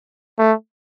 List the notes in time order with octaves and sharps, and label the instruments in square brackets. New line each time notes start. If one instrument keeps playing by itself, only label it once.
[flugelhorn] A3